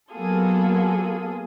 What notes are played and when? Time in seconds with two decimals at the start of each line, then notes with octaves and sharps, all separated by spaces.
0.11 F#3 A#3 B3 F4 G#4 A4